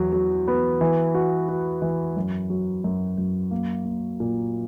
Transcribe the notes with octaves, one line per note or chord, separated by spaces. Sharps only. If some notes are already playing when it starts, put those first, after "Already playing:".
Already playing: E2 F#3
F#3
B3
E3
F#4
F#4
E3
F#2
F#3
F#2
F#2
A#3
A#3
A#2